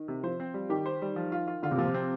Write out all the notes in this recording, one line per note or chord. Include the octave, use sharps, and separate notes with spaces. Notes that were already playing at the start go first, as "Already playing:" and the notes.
Already playing: D#3
C3
F3 C5
C4
G3
D#3 G4
C5
G3
F3
F4
F4
D3 F4
C3
A#2 F3
C3
C4